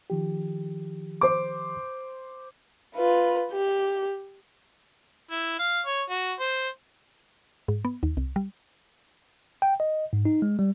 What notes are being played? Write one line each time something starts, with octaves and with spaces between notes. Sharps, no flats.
D#3 F3 G4
C5 D6
F4 B4
G4
E4
F5
C#5
F#4
C5
G#2
B3
D#2
C2
G3
G5
D#5
G#2
D#4
G#3
G3